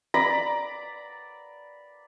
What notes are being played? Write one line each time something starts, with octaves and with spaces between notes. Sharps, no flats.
D5 A#5 B5 D6